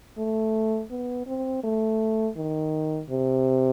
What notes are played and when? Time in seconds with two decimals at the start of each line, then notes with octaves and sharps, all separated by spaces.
0.18 A3
0.91 B3
1.27 C4
1.64 A3
2.37 D#3
3.10 C3